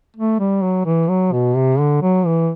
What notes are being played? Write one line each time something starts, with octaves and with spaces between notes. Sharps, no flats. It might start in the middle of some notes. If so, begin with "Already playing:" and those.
A3
G3
F#3
E3
F#3
B2
C3
D3
F#3
E3